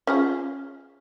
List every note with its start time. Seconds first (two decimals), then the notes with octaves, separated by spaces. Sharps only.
0.07 C#4 F4 G#4